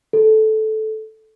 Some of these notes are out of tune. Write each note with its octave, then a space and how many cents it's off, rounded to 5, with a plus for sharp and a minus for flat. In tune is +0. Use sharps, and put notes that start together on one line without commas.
A4 -10